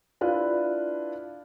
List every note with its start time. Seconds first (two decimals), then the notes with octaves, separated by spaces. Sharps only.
0.21 D4 E4 F4 B4 F5